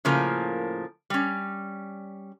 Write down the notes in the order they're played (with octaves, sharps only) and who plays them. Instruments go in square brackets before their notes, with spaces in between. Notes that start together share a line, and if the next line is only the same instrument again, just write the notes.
[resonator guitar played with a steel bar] A2 C#3 F3 A#3 A#4
G3 C#4